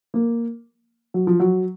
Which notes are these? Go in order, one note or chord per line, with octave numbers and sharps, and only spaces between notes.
A#3
F#3
F3
F#3